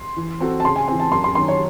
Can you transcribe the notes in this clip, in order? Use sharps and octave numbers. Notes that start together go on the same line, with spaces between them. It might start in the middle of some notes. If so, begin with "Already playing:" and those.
Already playing: C6
E3
C4 F#4 A4 C5
A5
C#3 C6
G#5
E3 C4 G#5
A5
F#2 C6
C6
D#3 F#3 C6
C#5